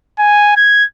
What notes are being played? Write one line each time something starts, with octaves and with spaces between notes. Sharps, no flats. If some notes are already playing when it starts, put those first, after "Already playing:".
G#5
G#6